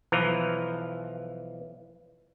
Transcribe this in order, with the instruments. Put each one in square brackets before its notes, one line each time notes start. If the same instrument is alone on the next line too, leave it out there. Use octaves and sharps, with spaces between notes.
[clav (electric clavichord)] B1 E3 F3 A#5